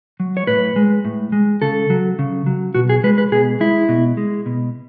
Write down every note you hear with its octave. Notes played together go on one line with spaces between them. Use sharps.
F#3
C#5
A2 B4
G#3
A2
G#3
C#3 A4
F#3
C#3
F#3
B2 F#4
G#4
G#3 B4
B4
B2 G#4
G#3 E4
B2
G#3
B2